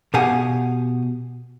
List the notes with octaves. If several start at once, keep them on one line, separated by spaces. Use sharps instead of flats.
B2 B3 G4 F5 F#5 G#5